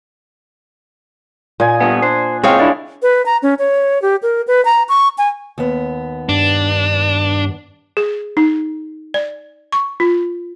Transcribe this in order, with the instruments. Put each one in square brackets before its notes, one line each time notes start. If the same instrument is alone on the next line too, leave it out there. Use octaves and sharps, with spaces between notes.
[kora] A#2 [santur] D#5 G#5
[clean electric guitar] G2 B3
[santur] D4 [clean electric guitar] C5
[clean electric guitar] C#2 C4 [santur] G#3 E4 D#6 [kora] C#5 F5 G5
[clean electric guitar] C2 D4 E4 [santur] D5
[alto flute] B4
A#5
C#4
C#5
G4
A#4
B4
A#5
C#6
G#5
[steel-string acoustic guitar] D#2 B3
[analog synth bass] G2 [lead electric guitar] D4
[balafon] G#4
D#4
D5
C#6
F4